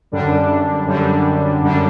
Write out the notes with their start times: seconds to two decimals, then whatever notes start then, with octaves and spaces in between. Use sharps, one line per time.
0.12 F#2 D3 G3 D4
0.86 F#2 D3 G3 D4
1.61 F#2 D3 G3 D4